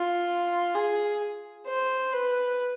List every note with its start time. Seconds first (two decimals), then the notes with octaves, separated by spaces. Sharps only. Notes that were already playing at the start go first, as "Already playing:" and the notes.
Already playing: F4
0.75 G#4
1.67 C5
2.13 B4